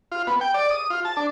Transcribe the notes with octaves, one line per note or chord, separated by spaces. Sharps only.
F4
B3
G5
D5
D#6
F4
A5
D4